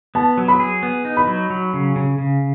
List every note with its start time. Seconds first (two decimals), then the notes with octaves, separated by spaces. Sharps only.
0.15 B3 A5
0.37 F#3
0.48 B5
0.60 G#4
0.83 B3
1.05 D#4
1.17 B5
1.27 F#3
1.50 F#3
1.74 C#3
1.96 C#3
2.18 C#3